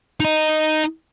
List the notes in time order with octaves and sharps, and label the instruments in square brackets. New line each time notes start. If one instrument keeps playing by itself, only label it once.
[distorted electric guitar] D#4 D#5